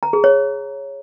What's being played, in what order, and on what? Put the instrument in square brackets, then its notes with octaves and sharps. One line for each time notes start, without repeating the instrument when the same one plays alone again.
[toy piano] A#5
G#4
C#5